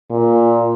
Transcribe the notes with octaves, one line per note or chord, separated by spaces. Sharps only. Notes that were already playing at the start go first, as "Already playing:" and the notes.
A#2